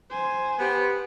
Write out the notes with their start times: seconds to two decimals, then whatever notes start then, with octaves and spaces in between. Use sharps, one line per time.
0.10 C5 G#5
0.59 B3 G4